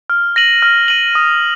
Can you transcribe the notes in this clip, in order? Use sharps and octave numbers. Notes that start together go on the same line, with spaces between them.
F6
A#6 D#7 F#7
F6
A#6 D#7 F#7
D#6